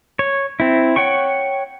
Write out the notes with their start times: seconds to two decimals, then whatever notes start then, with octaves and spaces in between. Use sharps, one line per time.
0.19 C#5
0.60 C4 E4
0.96 C#5 F#5 G5 C#6